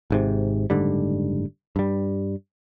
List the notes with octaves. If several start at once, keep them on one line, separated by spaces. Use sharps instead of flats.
G#1 G#2 C3
F#1 G#2 D3 G3
G2 G3